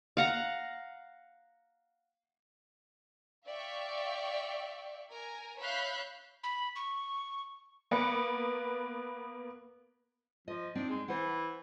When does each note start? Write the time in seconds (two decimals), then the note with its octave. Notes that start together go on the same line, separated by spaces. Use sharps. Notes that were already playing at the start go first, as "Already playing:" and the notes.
0.17 F5 F#5 A#5
3.45 D5 E5 F5 G5 C#6
5.10 A#4 G#5
5.58 C#5 E5 F5 B5 F#6 G6
6.43 B5
6.76 C#6
7.91 A#3 B3 B4 C#7
10.48 F3 D#5
10.75 C4 D4 D#4
10.89 G#3
11.08 E3 C5 F#5